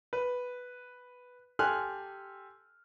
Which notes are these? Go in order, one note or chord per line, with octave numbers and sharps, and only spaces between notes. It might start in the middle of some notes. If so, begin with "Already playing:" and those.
B4
G4 A4 G#5 C6 F6 F#6